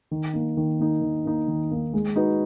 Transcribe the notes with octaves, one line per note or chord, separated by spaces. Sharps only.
D#3
A#3 D#4
D#3
A#3 D#4
D#3
A#3 D#4
D#3
A#3 D#4
G#3
D#4 F#4 B4